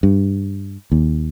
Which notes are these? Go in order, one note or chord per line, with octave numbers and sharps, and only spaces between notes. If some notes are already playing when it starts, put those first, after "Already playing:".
G2
D#2